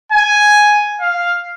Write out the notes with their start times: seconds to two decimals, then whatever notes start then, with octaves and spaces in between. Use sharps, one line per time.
0.12 G#5
1.01 F5